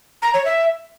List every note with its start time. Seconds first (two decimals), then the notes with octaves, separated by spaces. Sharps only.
0.22 A#5
0.34 C#5
0.45 E5